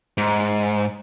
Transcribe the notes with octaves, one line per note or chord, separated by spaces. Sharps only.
G#2